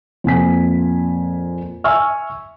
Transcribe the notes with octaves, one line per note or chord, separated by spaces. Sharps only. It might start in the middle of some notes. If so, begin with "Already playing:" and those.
F2 A#2 G#5 B6
E5 G#5 C#6 E6 F6